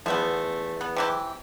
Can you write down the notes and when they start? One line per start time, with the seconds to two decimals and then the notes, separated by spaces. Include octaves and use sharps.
0.06 E2 F3 A3 B3
0.81 B3
0.96 C3 E3 G4